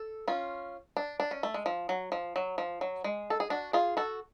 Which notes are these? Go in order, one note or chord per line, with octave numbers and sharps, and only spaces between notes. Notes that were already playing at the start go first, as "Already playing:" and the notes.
Already playing: A4
C#4 F4
D4
D4
C#4
A3
G#3
F3
F#3
F3
F#3
F3
F#3
G#3
A4
G#4
D4 F#4
F4 G#4
F#4 A4